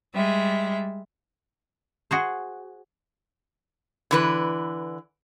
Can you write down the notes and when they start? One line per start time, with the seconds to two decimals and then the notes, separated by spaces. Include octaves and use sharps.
0.14 G3 G#3 E5
2.11 F#4 G#4 C5
4.11 D3 E3 B4